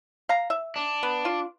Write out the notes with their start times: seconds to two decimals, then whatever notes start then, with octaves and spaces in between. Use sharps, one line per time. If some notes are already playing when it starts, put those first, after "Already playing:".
0.29 F5 A#5
0.50 E5
0.76 D4
1.03 B3
1.25 F4